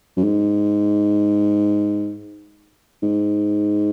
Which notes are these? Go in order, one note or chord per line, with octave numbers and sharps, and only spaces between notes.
F#2
G#2
G#2